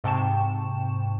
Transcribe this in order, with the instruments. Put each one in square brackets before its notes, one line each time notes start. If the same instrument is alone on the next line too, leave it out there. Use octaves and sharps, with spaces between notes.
[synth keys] G#2 C3 G5 A5 C#6 E7